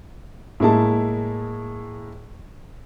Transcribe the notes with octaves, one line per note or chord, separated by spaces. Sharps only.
A2 G#3 A#3 E4 G#4 A5